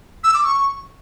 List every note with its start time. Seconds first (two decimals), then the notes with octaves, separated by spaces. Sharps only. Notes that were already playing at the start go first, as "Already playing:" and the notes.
0.24 E6
0.34 D6
0.44 C#6